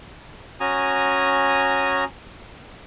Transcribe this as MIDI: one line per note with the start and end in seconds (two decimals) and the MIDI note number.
0.60 2.04 61
0.60 2.04 66
0.60 2.04 80
0.60 2.04 82
0.60 2.04 87